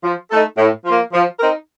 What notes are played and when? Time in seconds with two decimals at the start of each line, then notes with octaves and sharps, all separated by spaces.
0.04 F3
0.31 A3 D#4 A4
0.58 A2
0.85 F3 A#3 F4
1.13 F3
1.39 C4 D#4 A#4